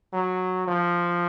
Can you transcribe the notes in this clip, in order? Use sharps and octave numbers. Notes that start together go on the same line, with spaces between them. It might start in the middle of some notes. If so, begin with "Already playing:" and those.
F#3
F3